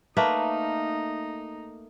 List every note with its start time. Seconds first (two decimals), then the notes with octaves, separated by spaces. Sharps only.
0.17 A3 A#3 D#4 B4